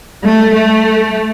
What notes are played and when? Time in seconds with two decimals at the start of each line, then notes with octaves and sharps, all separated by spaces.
0.24 A3
0.55 A3